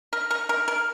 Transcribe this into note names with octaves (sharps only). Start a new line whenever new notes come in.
A#4
A#4
A#4
A#4